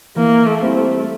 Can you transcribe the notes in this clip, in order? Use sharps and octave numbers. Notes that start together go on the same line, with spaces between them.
E3 A#3
A3
G3 C4 E4
A3